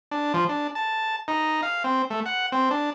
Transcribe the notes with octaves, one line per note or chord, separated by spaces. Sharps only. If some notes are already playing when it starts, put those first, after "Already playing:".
D4
F3
D4
A5
D#4
F5
C4
A3
F#5
C4
D4